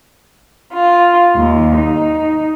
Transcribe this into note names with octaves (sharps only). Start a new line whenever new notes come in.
F4
D#2
D#4